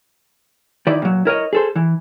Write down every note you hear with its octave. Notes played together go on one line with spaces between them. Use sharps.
D#3 E4 D5
A#2 F#3
E4 A#4 C#5 D#5
G#4 A4 C5
E3